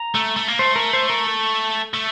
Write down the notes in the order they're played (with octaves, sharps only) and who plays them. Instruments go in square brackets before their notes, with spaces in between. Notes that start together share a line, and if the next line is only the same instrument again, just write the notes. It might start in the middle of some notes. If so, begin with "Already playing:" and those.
Already playing: [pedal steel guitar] A#5
[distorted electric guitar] A3
A3
A#3
[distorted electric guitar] A3 [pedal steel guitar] C5
[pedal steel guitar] A#4
C5
A#4
A4
[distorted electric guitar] A3